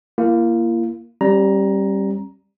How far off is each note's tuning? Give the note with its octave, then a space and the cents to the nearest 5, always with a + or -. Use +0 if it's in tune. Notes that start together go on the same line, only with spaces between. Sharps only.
A#3 +0 E4 +45
G3 +0 C#4 -45 A#5 +15